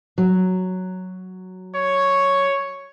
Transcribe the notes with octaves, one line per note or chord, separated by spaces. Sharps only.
F#3
C#5